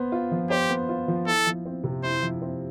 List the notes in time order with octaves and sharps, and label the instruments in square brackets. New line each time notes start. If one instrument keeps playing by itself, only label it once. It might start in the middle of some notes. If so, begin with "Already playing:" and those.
Already playing: [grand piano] B3 C5
F4
F3
[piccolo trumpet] G4 [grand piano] C5
[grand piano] B3
F4
F3
[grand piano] E4 [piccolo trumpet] A4
[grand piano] F3
C4
C3
[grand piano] E4 [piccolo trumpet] C5
[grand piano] F3
C4